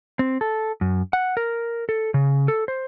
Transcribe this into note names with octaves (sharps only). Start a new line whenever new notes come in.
C4
A4
F#2
F#5
A#4
A4
C#3
A4
C5